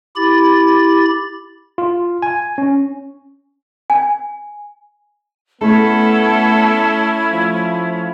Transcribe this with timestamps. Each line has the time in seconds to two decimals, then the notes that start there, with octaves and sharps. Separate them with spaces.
0.16 E4 G4 B5 A6
1.78 F4
2.22 G#5
2.58 C#4
3.90 G#5
5.61 A3 B3 C#4 E4 A4 B5
7.32 F3